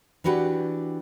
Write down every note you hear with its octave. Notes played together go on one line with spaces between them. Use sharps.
E3 D4 F#4 G4 B4